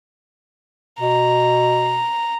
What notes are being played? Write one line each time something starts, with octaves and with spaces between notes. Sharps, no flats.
B2 A#5